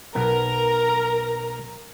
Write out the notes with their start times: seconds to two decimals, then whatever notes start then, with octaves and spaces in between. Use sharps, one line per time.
0.15 B1 B3 A#4 A#5